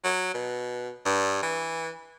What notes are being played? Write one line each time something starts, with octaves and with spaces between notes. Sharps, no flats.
F#3
B2
G2
E3